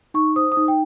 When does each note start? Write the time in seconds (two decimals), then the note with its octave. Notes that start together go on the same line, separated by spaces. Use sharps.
0.14 D#4 C#6
0.36 C5 D#6
0.52 D#6
0.57 D#4
0.68 G5